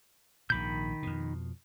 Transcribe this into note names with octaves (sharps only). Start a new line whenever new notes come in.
A#1 G#2 D#3 B5 G6
F2 B2